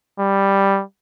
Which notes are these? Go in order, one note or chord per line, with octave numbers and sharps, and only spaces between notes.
G3